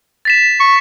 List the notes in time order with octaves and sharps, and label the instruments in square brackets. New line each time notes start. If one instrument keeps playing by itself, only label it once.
[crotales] A6 B6 E7
[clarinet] C#6